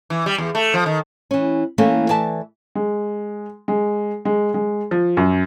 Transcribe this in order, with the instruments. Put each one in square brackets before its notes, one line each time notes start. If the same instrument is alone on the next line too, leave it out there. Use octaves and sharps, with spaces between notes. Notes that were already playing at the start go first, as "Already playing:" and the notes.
[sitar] E3
G3
E2
A3
F3
D#3
[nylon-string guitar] E3 C#4
E3 A3 A#3 C#4 A4
E3 D5 E5 A5
[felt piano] G#3
G#3
G#3
G#3
F3
F#2